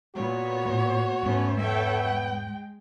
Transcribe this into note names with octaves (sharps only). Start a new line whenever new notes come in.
A#2 B3 F#4 C#5
A2 A3
E1 G#2 A3 B3 C#4
B3 A4 C#5 E5 G5
G#3